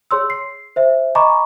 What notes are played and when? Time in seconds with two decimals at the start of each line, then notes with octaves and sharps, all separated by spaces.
0.11 G#4 C#5 C6 E6
0.30 C7
0.76 C5 E5
1.15 D#5 G#5 A#5 B5 C#6 D6